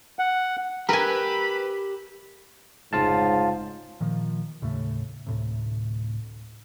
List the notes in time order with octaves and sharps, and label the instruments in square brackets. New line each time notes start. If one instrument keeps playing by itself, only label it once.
[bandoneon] F#5
[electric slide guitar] G4 [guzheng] A#4 G#5 [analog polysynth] B4 E6 F#6 [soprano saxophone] B5
[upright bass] F1 [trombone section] G#2 C#3 [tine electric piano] F4 F5 A5
[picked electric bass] A#2 D#3 F3
D#2 A2 C#3 A3
D2 A2 C3